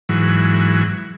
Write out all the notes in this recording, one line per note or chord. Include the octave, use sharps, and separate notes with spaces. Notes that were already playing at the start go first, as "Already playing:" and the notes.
G#2 E3 F#3